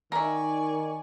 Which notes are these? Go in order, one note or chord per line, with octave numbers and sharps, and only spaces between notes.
D#3 A#4 D5 E5 G#5 C#6